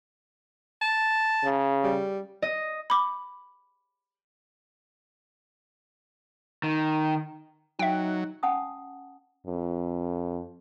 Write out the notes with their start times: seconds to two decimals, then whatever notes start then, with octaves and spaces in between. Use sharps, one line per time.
0.82 A5
1.44 C#3
1.84 G3
2.42 D#5
2.90 B5 D6
6.63 D#3
7.79 F#3 D#4 E5 G5
8.43 C#4 F#5 G#5 A5 D#6
9.46 F2